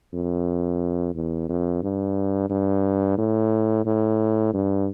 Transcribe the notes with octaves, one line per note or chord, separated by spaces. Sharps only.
F2
E2
F2
G2
G2
A2
A2
G2